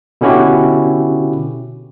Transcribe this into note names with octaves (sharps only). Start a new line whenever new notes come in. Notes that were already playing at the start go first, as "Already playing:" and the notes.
B2 D3 C#4 E4 F#4 G4